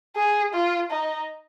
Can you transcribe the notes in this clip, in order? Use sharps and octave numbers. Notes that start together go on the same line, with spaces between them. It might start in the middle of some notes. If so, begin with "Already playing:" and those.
G#4
F4
D#4